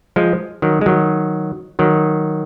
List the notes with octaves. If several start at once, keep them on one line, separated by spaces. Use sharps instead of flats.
F3 G#3
D#3 F#3
G#3
D#3 F#3
D#3 F#3